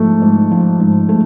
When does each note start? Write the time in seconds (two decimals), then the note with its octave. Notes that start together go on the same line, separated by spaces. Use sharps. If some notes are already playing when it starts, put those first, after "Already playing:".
Already playing: G#2 F3 A3
0.22 G#2
0.51 F3
0.80 G#2
1.09 A3